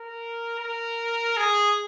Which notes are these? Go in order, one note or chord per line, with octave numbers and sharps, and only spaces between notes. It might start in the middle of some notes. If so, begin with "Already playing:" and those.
Already playing: A#4
A#4
G#4